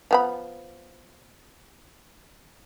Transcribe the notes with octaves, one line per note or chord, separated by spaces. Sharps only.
F3 B3 B5